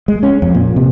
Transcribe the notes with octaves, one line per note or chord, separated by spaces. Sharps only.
G#3
C#4
F2
A#2
C3